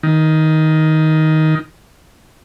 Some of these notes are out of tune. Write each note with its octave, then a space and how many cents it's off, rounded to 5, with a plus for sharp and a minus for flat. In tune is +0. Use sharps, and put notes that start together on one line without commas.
D#3 +10